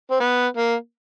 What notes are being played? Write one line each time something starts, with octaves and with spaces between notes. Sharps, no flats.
C4
B3
A#3